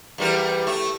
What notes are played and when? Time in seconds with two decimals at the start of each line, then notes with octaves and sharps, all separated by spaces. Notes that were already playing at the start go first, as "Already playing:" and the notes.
0.18 E2 G3 A#4
0.67 A3